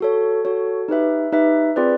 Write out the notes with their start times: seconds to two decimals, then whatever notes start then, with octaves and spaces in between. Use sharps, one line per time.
0.01 F#4 A4 C#5
0.45 F#4 A4 C#5
0.88 D#4 G4 B4 E5
1.32 D#4 G4 B4 E5
1.76 C4 F4 G#4 B4 D5